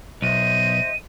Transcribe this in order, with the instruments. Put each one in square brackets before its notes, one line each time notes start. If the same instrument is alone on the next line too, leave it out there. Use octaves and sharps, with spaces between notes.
[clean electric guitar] B1 [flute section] C5 D#5 E5 [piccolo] D#7